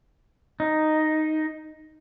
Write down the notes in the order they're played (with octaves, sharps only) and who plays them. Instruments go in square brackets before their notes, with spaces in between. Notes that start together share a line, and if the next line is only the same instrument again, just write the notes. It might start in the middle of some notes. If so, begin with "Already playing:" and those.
[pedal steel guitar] D#4